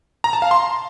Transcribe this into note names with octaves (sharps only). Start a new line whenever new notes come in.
A#5
A5
F5
C6